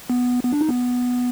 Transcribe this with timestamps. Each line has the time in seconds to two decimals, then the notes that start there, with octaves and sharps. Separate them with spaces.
0.10 B3
0.43 B3
0.53 D4
0.61 D#4
0.69 B3